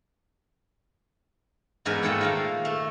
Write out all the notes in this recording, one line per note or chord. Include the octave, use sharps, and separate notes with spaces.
E2 G#2 A#4 B4 G#5
A#2 A3 A4 C5 F#5 G5
D#3 A#4 F5
A3